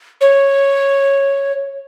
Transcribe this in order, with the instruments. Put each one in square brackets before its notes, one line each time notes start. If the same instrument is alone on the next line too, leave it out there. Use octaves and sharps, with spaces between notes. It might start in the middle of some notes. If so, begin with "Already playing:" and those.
[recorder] C#5